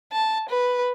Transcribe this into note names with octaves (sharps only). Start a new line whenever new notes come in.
A5
B4